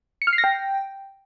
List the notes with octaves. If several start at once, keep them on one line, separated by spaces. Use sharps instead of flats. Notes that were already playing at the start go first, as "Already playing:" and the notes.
C#7
F6
C7
A#6
G5